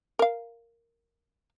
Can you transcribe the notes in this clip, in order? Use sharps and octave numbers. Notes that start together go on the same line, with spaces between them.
A#4 F5